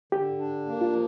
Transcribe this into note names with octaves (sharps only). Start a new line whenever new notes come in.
D3 G4
D4
A#3
F4
F3